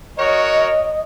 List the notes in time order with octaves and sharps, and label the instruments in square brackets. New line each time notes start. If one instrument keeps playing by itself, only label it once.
[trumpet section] F#4 A#4 C#5 [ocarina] D#5